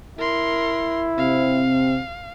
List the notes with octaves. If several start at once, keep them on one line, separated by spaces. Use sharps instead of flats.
E4 A#4 C6
C3 C4 F5